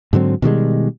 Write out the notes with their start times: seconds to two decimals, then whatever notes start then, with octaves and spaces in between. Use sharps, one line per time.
0.13 G#2 D3 F#3 C4
0.42 B2 D#3 G3 G#3